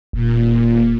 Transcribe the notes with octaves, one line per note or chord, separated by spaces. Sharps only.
E1 A#2